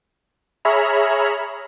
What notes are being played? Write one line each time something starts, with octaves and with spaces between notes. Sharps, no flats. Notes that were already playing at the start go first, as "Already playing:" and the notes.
G#4 C#5 E5 A#5 B5 F6